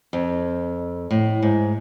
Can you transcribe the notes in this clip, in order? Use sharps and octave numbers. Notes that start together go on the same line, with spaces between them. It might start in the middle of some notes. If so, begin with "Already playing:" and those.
F2
A2
G#2